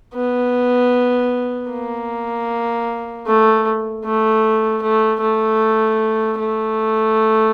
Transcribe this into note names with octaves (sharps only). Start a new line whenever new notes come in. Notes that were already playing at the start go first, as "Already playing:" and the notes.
B3
A#3
A3
A3
A3
A3
A3